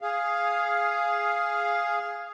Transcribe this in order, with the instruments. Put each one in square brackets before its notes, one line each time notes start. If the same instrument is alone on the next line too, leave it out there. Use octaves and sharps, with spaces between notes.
[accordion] G#4 F5